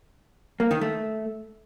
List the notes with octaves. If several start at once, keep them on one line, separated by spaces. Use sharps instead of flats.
A#3
D#3
A3